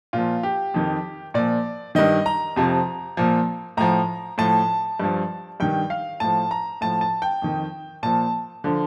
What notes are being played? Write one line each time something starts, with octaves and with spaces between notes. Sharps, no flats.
A#2 F3 F4
G4
F2 D#3
A#2 F3 D5
G2 D#3 D#5
A#5
F2 C3 F3
A#2 F3
A2 F3 A#5
A2 F3 A5
G2 F3
G2 D#3 G5
F5
A2 F3 A5
A#5
A2 F3 A5
A5
G5
F2 D#3
A#2 F3 A5
D3 F3